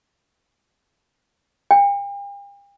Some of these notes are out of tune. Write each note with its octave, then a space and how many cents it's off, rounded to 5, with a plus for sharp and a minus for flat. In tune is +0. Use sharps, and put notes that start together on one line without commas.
G5 +45